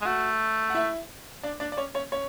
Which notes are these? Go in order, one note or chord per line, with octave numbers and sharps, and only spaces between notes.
G#3
A3 F#4 F#5
F#5
E4 E5
D4 D5
D4 D5
D5
C#4 C#5
C#4 C#5
C#4 C#5